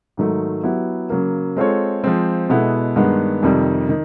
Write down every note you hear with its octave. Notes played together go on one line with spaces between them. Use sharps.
G#2 D#3 F#3 A3
F#3 B3 E4 G4
C#3 F#3 A#3
G#3 C4 F4 A4 C#5
F3 G#3 C4
B2 G#3 B3 E4 A4
G2 D#3 G#3 B3
F2 C3 D#3 G3
D#3